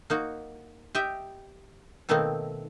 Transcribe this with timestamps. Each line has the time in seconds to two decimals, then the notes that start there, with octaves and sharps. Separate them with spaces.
0.10 A#3 D#4 F#4
0.95 G4 D#5 E5 G5
2.09 B2 D#3 A3 A#3 C4 D#4